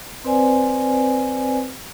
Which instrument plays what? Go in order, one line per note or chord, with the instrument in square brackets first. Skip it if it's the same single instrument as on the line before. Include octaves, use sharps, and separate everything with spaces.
[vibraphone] C4 B4 C5 D5 G#5